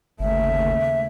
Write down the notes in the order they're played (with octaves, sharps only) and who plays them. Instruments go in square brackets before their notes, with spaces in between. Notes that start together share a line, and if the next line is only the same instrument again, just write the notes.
[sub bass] G1 [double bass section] D#2 C#3 A3 [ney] E5